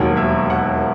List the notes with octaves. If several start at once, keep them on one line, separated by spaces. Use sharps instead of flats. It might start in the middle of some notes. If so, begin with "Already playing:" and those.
Already playing: E1 D#2 D#3 F#3 A#4
E5
F#5